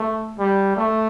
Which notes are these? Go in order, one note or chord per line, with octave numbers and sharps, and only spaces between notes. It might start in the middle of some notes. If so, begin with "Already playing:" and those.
Already playing: A3
G3
A3